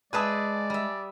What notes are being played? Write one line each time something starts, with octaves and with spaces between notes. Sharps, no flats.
G#3 G#4 B4 D5 E5 G#5 A5 D#6
G3 E5